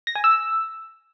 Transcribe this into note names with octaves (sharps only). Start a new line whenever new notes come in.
A#6
G#5
E6